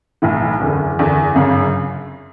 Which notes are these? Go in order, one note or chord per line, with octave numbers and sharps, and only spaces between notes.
B1 A2 E3
F#1 E2 D3
F#1 E2 D3
G1 F#2 C#3